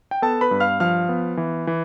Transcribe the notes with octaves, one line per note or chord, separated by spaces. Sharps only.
G5
B3 A4 A5
B4 B5
G2
F5 F6
F3 F5 F6
B3
E3
E3